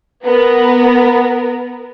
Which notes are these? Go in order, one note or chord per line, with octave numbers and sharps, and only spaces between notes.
B3 A#4